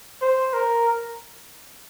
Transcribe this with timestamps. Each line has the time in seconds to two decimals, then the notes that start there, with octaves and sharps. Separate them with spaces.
0.21 C5
0.53 A#4